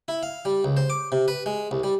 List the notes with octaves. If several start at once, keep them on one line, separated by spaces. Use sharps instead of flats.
E4
F5
G3
C#2
C5
D6
C3
B4
G#3
C2
G3